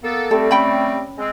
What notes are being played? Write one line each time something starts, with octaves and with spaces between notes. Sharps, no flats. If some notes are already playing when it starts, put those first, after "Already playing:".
A#3 B3 A4
G3 A3 C4 A4
C#4 G5 B5
G#3 C4